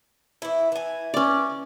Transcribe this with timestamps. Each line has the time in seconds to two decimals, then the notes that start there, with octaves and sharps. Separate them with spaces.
0.42 E3 E4
0.72 E3 G#5
1.14 C#4 D5